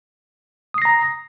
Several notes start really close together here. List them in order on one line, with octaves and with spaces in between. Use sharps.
D#6 C7 A#6 A#5